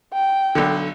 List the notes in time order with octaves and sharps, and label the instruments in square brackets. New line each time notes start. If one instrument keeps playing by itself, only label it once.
[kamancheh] G5
[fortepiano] B1 D3